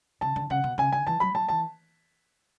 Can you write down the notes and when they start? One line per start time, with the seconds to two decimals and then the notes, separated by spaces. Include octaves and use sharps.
0.21 C#3 A5
0.36 D3
0.50 C#3 F#5
0.64 B2
0.78 C#3 G#5
0.92 D3 G#5
1.07 E3 A5
1.20 F#3 B5
1.34 F#3 A5
1.49 E3 A5